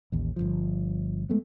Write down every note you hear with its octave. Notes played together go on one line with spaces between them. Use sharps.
A1 D#2
G1 C2 F3
G#3 A3 B3